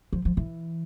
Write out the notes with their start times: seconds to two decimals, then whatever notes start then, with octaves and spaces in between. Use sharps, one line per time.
0.13 F3
0.25 F3
0.37 E3